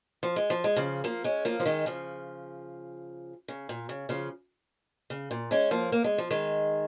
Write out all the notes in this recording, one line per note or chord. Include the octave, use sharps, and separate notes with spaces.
F3
G#3
F3
G#3
C#3 F3
F3 A#3
G#3 C#4
F3 A#3
F3
D#3 G#3
C#3 F3
C#3
A#2
C#3
C#3 F3
C#3
A#2
G#3 C#4
F3 A#3
A#3
G#3
F3
D#3 G#3